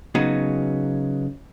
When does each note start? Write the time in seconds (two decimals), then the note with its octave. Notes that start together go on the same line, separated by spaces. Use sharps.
0.15 C#3 F#3 B3 D#4